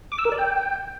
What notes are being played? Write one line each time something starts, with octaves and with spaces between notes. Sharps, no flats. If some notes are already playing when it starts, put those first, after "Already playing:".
D6
E6
A#4
D5
G5